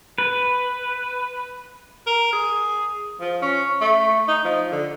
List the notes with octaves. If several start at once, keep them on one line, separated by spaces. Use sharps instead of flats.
B4
A#4
G#4
F3
C#4
A3
D#4
F3
D3